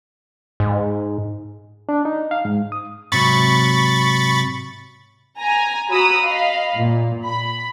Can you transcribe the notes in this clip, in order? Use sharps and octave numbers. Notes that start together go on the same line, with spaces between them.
G#2
D4
D#4
F5
G#2
D#6
G#2 C3 F#3 B5 C#6 A6
G#5 A#5
F#4 C#5 A#5 B5 D#6 E6
D#5 F5 B5
A#2
B5